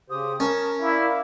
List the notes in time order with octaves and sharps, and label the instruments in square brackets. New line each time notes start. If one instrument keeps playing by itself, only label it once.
[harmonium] C#3 G4 C5 [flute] D#6
[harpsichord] C#4 [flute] A#4 [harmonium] A5
[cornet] E4 [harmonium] D5 E5 F5